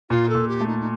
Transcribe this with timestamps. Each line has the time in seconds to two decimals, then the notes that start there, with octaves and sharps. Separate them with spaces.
0.10 A#2 F4
0.29 A4
0.35 A#2
0.48 G4
0.61 A3
0.67 D#4
0.79 D#4